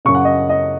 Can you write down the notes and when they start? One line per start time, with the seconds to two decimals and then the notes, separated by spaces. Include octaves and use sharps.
0.05 F#2 C#3 C#6
0.15 F#5
0.25 D#5
0.49 D#5